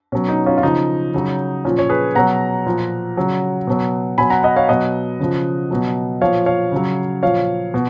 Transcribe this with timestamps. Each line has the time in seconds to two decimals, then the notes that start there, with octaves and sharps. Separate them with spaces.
0.12 B2 F#3 C#4
0.29 D#4
0.46 C#4 F4
0.58 F4
0.63 C#3 F3 D#4
1.14 C#3 F#3
1.65 A#2 F3 C#4
1.79 C#5
1.89 G#4 B4
2.15 B2 F#3 F#5 A#5
2.66 A#2 F3
3.17 C#3 F#3
3.67 B2 F#3
4.18 B2 F#3 G#5 B5
4.30 F#5 A#5
4.43 D#5 F#5
4.56 C#5 F5
4.69 B2 F#3 D#5 F#5
5.20 C#3 F3
5.71 B2 F#3
6.21 A#2 F3 C#5 F5
6.46 C#5 F5
6.72 C#3 F#3
7.23 A#2 F3 C#5 F5
7.74 B2